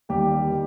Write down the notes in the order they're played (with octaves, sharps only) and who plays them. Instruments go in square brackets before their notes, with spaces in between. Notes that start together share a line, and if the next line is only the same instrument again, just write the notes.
[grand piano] D#2 G3 G4
D#3